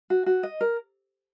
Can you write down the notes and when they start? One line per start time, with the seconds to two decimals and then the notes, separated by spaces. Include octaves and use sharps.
0.10 F#4
0.26 F#4
0.43 D#5
0.61 A#4